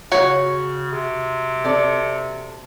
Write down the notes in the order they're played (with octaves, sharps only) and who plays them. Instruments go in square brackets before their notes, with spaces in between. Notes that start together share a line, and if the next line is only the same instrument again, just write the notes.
[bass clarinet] C#3 [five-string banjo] F#4 C#5
[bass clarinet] C3
[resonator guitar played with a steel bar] C4 A4 D5